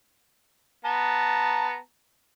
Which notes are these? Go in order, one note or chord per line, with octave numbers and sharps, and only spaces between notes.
B3 A5 A#5